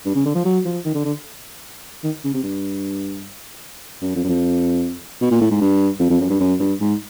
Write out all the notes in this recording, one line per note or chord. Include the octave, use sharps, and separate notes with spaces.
G2
C#3
D3
F3
F#3
F3
D#3
D3
D3
D#3
C#3
C3
G2
F#2
F2
F#2
F2
B2
A#2
A2
G#2
G2
F2
F2
F#2
G2
F#2
G2
G#2